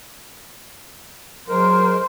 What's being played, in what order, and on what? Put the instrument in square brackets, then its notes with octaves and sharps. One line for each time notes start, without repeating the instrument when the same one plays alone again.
[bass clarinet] F#3 [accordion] G#3 A#4 [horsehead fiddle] C5